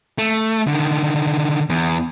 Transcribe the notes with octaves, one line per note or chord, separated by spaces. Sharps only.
A3
D3 D#3
E2